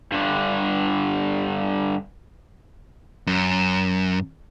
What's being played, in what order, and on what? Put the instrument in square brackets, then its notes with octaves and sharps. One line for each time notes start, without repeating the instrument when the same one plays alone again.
[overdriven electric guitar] G2 D3
[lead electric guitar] F#2